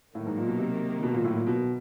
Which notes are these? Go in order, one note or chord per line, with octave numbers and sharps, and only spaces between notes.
A2 D#3 F#3 A#3
G#2
A#2
B2
C3
B2
A#2
A2
A#2
B2